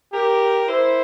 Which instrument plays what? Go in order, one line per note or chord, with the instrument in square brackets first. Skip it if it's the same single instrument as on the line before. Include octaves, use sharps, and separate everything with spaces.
[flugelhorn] G4 [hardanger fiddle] A#4
[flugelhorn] E4 [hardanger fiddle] C5